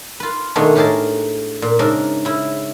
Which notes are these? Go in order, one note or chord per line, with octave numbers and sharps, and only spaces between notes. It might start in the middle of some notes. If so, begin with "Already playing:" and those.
F4 B4
B2 D#3 G#3 A3 B3 D4
A2 G4 G#4 A#4 A5
A#2
G#2 C#3 D4 A#4 E5
C#3 E4